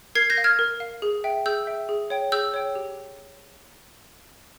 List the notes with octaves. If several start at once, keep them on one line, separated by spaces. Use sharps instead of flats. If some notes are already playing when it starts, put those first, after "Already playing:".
A#4 G#6 C7
G6 A#6
F5
F6 G#6
A#4
F5
G#4
E5 G5
G#4 E6 G6
E5 G5
G#4
C#5 G5
G#4 E6 G6
C#5 G5
G4